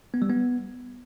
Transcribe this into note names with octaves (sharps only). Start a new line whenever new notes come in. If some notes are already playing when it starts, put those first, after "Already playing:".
B3
G3
B3